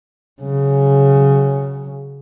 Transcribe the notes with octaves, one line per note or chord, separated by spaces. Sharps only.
C#3 F#3